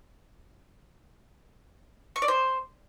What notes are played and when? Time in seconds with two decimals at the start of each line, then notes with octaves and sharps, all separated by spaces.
2.16 C#6
2.22 D5
2.28 C5